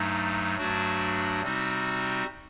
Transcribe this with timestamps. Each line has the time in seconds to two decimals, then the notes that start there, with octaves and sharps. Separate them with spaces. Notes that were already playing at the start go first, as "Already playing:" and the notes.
Already playing: G2 F#3 A3 D#4
0.57 G2 F#3 A3 D4 F#4
1.42 C3 G3 C4 D#4 F#4